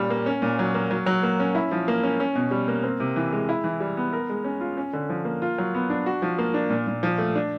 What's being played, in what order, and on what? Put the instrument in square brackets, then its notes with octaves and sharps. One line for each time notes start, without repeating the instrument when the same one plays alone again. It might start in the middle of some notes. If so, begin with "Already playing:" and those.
Already playing: [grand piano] A#2 G3 C#4
A#3
C#4
A#2
F#3
A#3
F#3
F#3
A#3
C#4
E4
F3
A#3
C#4
C#4
B2
G3
A#3
C4
C3
E3
G#3
E4
E3
G3
B3
A#4
G#3
C#4
F4
C#4
D3
F3
A#3
F4
F#3
B3
D4
F#4
F3
A#3
D4
A#2
A#2
F3
A3
D4